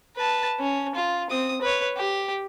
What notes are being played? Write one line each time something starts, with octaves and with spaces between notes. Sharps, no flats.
B4 A5
C#4
F4
C4 D#6
B4 C#5
G4